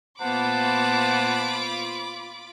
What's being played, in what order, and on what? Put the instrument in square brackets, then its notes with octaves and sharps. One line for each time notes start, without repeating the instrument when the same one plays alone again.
[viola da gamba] A#2 B3 C5 [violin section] F4 B5 D6 [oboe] F#5 [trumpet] A5